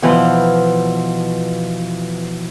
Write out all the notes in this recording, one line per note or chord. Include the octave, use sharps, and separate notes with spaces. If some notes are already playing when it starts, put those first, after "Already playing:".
B2 E3 F3